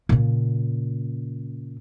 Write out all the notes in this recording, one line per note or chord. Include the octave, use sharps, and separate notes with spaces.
A#2 C#3